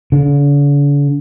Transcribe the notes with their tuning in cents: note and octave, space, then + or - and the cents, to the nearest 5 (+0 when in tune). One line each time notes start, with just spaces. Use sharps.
D3 -45